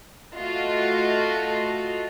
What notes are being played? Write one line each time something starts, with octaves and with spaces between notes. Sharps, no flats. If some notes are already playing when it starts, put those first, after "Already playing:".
A3 F4 F#4 D#5